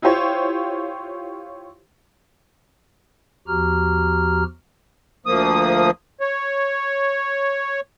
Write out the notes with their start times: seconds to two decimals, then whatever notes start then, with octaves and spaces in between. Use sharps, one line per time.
0.02 E4 F4 G4 C5 C#5
3.48 E2 F3 F#4 G4 A#5 F6
5.26 D2 F3 A#3 D#6
6.21 C#5